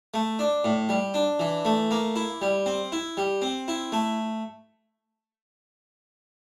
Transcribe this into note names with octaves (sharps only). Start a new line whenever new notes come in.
A3
D4
A2
G3
D4
E3
A3
A#3
E4
G3
C4
E4
G3
C4
E4
A3